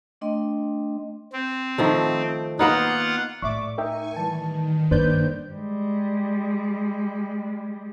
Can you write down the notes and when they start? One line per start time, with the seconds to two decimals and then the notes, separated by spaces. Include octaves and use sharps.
0.21 A3 D4 D#5 G5 C6
1.33 C4
1.78 D#3 F3 A3
2.59 A#3 B3 D#4 F4 F#5
3.42 A2 D5 E5 C#6 D6
3.78 D#4 A#4 E5 G5 G#5 C#6
4.17 D#3 E3 G3 A5
4.91 G2 A#3 D4 B4 C5 D5 G6
5.52 G3 G#3